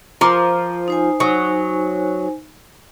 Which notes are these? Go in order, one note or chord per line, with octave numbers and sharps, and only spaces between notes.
F3 A#4 C6 D6
D#4 C5 G#5
F#3 C#6 D#6